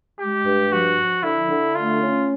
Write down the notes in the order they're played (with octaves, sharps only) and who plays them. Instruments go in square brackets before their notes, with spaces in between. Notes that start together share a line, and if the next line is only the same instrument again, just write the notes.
[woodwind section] G#3 [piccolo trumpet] G4
[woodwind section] G2
[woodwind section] F3 [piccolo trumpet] F#4
[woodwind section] F3
[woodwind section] D3 [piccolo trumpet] E4
[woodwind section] D3
[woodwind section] A3 [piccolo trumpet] F4
[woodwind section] C#4